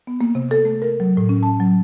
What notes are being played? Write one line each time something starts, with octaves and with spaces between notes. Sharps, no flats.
B3
A#3
C3
A4
A3
A#4
F#3
A2
C#4
A5
F#3